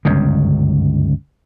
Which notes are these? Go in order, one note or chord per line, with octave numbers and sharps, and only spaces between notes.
G1 C#2 F#2 C#3